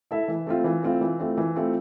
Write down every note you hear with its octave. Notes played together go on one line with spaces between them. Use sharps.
E4 A4 E5
E3
A3 C4 F4
E3
A3 C4 F4
E3
A3 C4 F4
E3
A3 C4 F4